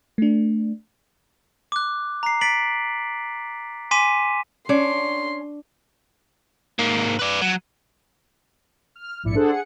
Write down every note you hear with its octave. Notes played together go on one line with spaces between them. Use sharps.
A3 D4
D6 F#6
A#5 C7
A6 B6 D7 F#7
G#5 C6 D6 B6 D#7 E7
C#4 D4 C6
G#2 A#3
B4 D5
F#3
F6
A#1 G#2 E4 D5 E5 C#7
D4 G#4 A4 C5 F#5
G#4 F#5 C#7